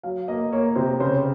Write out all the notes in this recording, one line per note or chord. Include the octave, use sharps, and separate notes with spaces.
F#3 F5
A#3 D#5
A#3 C#5
C3 C5
C#3 C5
C#5
C5